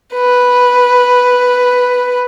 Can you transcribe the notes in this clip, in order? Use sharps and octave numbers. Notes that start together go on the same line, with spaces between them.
B4